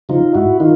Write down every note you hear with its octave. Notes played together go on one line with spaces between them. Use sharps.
C#3 F3 D#4 F4
G#2 E4 F#4
D#3 D#4 F4